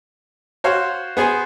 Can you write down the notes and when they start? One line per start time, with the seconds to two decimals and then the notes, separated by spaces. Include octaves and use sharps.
0.64 F#4 C5 C#5 F5
1.17 B3 G#4 C5 G#5